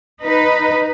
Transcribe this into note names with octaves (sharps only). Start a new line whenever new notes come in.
D#4 B4